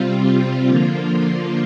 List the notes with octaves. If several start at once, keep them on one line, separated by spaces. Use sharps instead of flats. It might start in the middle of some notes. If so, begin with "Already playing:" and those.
Already playing: C3 G3 C4 F4
D3 F3 A#3 F4